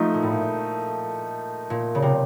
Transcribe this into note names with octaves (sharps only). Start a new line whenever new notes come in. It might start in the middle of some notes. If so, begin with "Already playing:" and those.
Already playing: F3 A3 D#4
A#2
A2
A#2
A#2
C#3
C3